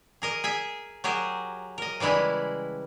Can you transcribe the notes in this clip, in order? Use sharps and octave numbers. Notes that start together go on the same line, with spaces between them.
G#4 A#4 D#5
G#4 E5 G#5
F#3 G4 G#4 A#4
A#4 D#5
C#3 E3 G3 G#3 E4